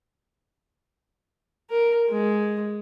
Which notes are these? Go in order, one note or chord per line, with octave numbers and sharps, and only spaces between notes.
A#4
G#3